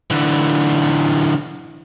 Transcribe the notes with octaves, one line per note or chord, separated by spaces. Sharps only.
D3 E3